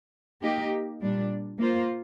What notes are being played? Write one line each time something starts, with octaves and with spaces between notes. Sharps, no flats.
A#3 D#4 G4
A#2 G3 D4
A#3 F4 C5